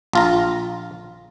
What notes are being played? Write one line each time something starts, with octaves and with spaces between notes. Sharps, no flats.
A#1 F4 A#5